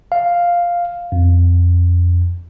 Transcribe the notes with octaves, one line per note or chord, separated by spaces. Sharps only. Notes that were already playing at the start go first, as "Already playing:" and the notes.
F5
F2